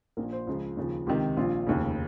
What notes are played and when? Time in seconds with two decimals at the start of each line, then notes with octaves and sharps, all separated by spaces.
0.17 A#1 A#2 F3 A#4
0.32 C5
0.47 C#2 C#3 F3
0.77 D#2 C#3 F3
1.07 C#2 C3 D#3 G4
1.37 A#1 A#2 F3 F4
1.67 F1 D#2 C#3